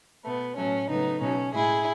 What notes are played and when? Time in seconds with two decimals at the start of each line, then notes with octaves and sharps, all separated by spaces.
0.24 B2 A3 B3
0.56 A2 F#3 A3 C#4
0.88 C#3 F#3 A3 B3 D#4
1.21 B2 F#3 A3 C#4
1.53 A2 G#3 E4 G#4